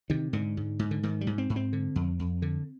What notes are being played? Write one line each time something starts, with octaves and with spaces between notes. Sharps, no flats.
C3 D#3
G#2 D3
G#2
G#2
D3
G#2 D#3
G3
G#2
C4
G#2
C4
D3
F2
F2
D3